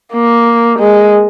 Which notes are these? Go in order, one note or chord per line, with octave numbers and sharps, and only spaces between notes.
A#3
G#3